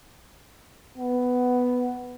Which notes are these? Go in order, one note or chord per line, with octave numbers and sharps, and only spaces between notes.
B3